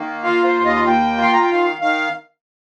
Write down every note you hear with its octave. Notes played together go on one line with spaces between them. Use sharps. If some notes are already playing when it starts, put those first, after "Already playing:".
Already playing: D#3 A#3
F4 F5
C5
D#2
D#5
A#3 G5
F4 C6
A#5
G5
D#3 F5
D#3 F5